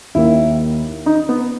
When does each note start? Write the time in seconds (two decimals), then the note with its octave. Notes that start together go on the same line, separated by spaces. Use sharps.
0.15 D#2 D#3 A#3 E4
1.06 D#4
1.29 B3